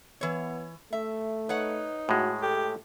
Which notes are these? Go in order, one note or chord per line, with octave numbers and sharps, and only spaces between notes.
E3 B3 C#5
A3 E5
D#4 B4 C#5 F#5
A2 G#3 F#4
G4 A4